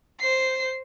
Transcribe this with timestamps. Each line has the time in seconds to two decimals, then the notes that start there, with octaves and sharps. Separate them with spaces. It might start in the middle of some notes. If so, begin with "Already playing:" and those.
0.20 C5 C7